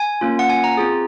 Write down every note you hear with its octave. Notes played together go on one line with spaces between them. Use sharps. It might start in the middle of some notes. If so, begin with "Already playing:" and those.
Already playing: G#5
A#3 C#4 F4
F#5
G#5
A#5
C4 F4 G#4